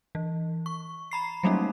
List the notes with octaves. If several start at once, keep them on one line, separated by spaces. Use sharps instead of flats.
E3
C#6
A#5 B5 C7
F#3 G3 A3 A#3 C#4 D#4